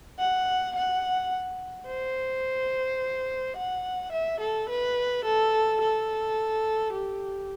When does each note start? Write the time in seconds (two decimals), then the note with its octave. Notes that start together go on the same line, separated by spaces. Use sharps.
0.19 F#5
0.76 F#5
1.87 C5
3.57 F#5
4.12 E5
4.40 A4
4.69 B4
5.25 A4
5.81 A4
6.93 G4